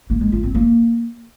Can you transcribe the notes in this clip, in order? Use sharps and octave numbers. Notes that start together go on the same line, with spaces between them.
A#3
G#3
F4
C4
A#3